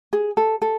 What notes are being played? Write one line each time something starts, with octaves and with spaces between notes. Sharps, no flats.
G#4
A4
A4